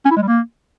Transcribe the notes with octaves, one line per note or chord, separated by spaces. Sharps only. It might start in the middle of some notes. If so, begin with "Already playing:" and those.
C#4
E4
G#3
G3
A#3